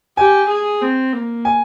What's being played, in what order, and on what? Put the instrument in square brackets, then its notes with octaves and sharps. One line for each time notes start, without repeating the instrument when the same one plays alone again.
[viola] G4 [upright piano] G#5
[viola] G#4
C4
A#3
[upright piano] G#5